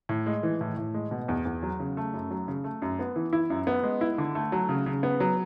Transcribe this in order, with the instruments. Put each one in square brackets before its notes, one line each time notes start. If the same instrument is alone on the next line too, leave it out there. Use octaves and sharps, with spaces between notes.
[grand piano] A2
G#3
E3
A2
A2
G#3
B2
E2
E2
F#3
C#3
A3
F#2
F#3
C#3
A3
F#2
B3
E3
E4
F#2
B3
G#3
E4
D3
A3
F#3
C#3
C#3
B3
F#3